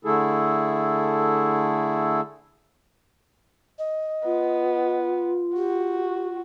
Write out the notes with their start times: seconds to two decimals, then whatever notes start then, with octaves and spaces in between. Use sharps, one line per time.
0.05 D3 A3 E4 G#4 A4
3.79 D#5
4.25 B3 F4
5.56 F#4 G4